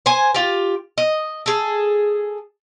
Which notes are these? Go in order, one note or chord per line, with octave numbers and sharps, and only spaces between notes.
C5 G#5
F4 G4
D#5
G#4 A4